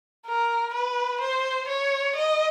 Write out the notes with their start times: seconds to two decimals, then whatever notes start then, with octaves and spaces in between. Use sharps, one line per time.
0.26 A#4
0.74 B4
1.21 C5
1.69 C#5
2.16 D#5